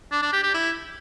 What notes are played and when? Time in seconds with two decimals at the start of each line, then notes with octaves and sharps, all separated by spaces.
0.12 D4
0.22 D4
0.33 G4
0.43 G4
0.54 E4